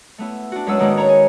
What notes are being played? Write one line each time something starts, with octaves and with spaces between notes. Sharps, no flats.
A3 B3 E4
D4 F#4
F#2 G#3 B4 F#5 E6
A2 D#3 G#3 A#3 D4 E4
C#5 A#5 B5
G#5